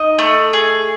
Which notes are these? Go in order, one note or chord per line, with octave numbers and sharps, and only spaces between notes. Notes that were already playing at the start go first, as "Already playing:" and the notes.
Already playing: D#4 D#5
A3
G#4